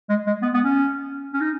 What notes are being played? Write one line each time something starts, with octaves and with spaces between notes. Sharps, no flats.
G#3
G#3
B3
B3
C#4
C#4
D#4